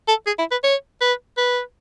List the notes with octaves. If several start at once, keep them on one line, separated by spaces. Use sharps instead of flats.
A4
G#4
E4
B4
C#5
B4
B4